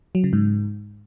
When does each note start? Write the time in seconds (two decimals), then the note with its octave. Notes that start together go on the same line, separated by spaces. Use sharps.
0.15 F#3
0.24 C#3
0.33 G#2